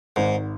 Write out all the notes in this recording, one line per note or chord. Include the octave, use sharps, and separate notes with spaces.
G#1 G#2